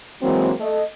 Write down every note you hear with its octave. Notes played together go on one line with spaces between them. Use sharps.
E3 F#3 G#3 A#3 C4
A3 D#5